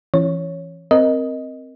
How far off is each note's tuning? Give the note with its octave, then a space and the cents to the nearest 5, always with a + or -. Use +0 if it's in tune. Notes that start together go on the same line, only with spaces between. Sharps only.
E3 +20 C#4 -20 C#5 +0
C4 +0 A#4 +0 D#5 +0